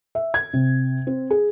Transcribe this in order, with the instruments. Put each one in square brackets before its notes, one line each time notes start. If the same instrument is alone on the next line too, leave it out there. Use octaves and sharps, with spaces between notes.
[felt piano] E5
G#6
C3
C4
G#4